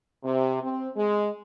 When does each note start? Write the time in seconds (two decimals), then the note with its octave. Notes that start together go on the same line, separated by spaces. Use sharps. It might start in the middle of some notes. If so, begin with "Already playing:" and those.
0.24 C3
0.62 C4
0.96 G#3